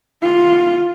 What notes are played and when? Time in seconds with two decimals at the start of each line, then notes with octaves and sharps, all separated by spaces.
0.23 F4